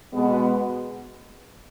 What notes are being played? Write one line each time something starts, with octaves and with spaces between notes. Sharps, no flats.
B2 G#3 B3